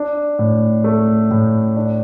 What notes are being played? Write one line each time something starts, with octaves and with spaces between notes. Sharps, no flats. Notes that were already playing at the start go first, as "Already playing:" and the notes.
Already playing: D4
A2
A3
A2
D4